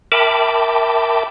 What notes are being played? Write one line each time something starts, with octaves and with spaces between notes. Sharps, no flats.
A#4 E5 G5 A5 B5 D6